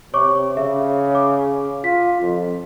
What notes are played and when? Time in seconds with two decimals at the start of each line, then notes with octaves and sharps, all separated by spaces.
0.14 C3 C#5 C#6 D6
0.57 C#3 E5
1.15 D6
1.84 F4 B6
2.21 F2